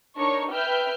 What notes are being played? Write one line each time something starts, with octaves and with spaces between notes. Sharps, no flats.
D4 D#4 A#4 C#5 C#6
B4 E5 G5 F6 G6